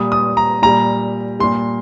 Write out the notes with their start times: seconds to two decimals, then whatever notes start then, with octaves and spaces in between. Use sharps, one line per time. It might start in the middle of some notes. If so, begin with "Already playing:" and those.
Already playing: A#2 G3 D#6
0.12 D#6
0.37 A#5
0.62 A#2 G3 A#5
1.40 A#2 G3 C6